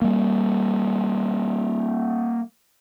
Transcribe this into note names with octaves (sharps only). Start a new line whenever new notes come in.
G3 A#3